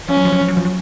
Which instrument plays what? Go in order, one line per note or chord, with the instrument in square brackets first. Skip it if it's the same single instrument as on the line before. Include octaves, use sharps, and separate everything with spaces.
[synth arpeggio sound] F3 [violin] C#4
[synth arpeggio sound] F#3
F3
F#3
F3
F#3
F3
F#3